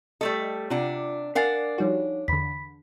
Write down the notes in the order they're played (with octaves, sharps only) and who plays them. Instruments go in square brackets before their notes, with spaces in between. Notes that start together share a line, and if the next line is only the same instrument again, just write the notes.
[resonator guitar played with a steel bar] G3 A3 A4 [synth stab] D#5
[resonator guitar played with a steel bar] C3 D4 F#5 [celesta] F4
[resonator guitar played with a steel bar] D4 F5 F#5 [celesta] A#4 G#5 A6
[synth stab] F3 G3 F#4 [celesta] D#4 C#5
[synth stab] E2 D3 [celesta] B5 B6